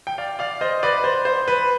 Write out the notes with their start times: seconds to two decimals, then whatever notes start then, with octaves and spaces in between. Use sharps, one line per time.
0.07 G5
0.18 D5 F5
0.39 D5 F5
0.61 C5 D#5
0.83 B4 D5
1.04 C5
1.25 C5
1.48 B4